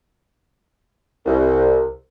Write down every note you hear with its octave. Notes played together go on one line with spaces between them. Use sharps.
C2